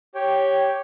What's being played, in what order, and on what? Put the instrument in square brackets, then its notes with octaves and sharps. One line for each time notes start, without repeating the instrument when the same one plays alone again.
[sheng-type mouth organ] G4 C#5 G5